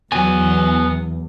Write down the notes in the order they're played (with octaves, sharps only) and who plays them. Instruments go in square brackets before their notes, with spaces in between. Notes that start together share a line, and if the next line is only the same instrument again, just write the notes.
[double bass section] E2 [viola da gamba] F#3 [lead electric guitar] B3 G#5